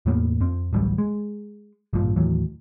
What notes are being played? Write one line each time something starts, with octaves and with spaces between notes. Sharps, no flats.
E2 A2 A#3 B3
F2 C4
D1 A1 F#3 G3
G#3
A1 G2 A#2 F3
D#2 A2 E3 F#3